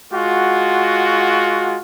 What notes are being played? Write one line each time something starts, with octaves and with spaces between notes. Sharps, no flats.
G#3 F4 F#4